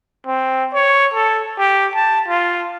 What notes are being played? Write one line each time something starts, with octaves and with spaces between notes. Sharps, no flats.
C4
C#5
A4
G4
A5
F4